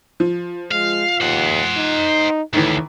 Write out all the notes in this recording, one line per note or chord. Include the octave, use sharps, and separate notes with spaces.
F3
G#3 F5
D#2 C5 F#5
D#4
D2 A2 D#3 E3